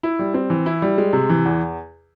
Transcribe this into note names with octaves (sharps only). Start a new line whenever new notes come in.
E4
G3
C4
E3
E4
G3
G#3
C3
E3
E2